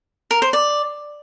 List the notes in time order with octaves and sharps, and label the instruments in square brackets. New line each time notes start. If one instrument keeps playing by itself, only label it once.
[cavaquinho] A#4
C5
D5